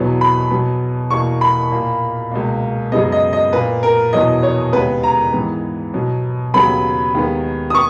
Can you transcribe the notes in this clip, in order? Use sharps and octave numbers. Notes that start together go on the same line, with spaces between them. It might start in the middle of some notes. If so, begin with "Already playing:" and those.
Already playing: E2 B2 F#3 B3
B5
B2 F#3 B3
E2 B2 A#3 C#6
B5
A#2 A#3
C#2 B2 A#3
F#2 C#3 G#3 B3 D#5
D#5
D#5
A#2 A#3 B4
A#4
E2 B2 F#3 B3 D#5
C#5
D#2 C#3 G#3 B3 B4
A#5
G#2 E3 B3
B2 F#3 B3
D#2 C#3 F#3 B3 B5
D#2 D#3 G#3 B3
D#6
B3 C#6